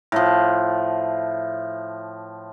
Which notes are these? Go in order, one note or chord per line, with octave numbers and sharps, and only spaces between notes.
A2 F3